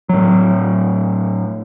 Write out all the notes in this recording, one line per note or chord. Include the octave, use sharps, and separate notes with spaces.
A2 F#3